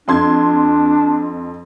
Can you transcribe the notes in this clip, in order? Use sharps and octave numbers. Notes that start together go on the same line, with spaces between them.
F2 D4 C6 G#6